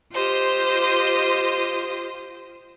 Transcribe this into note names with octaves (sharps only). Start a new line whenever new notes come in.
F4 G4 C5 D#5